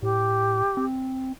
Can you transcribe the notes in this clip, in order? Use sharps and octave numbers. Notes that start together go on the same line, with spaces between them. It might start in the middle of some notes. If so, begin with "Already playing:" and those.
A2 G4
C4